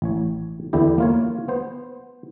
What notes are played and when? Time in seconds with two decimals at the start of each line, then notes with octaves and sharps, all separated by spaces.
0.02 A1 C#5
0.73 E2 D3 E4 G4
0.98 A#3 F4 C#5
1.48 B3 C5